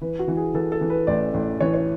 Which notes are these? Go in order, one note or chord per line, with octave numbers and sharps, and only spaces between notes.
E3 B4
F#4
E3
G#4
E3 A4
A4
E3
B4
A1 D5
A1
E3 C#5
C#5